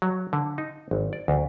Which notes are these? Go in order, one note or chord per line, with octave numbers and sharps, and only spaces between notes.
F#3
D3
D#4
G#1
D5
D2